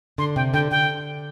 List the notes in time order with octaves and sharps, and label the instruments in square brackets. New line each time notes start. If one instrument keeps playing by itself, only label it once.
[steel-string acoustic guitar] D3 [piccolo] C6
[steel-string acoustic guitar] C3 [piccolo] G5
[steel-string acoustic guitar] D3 [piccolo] G5
[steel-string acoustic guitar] D3 [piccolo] G5